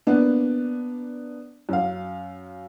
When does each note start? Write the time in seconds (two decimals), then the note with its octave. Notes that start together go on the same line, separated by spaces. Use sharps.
0.07 A#3 B3 D4
1.69 F#2 F5